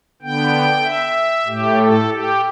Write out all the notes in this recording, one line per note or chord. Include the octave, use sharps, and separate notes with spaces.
D3 B3 G5
E5
A2 A3 G4
A4
G4